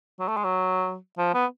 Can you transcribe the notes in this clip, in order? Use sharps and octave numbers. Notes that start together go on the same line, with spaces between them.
F#3
A3
G#3
F#3
F3
B3